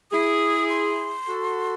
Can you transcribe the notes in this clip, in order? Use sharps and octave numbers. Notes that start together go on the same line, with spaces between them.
E4 G#4 D#6
C6
F#4 A4